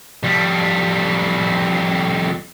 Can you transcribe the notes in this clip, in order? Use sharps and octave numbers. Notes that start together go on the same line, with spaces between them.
F2 G3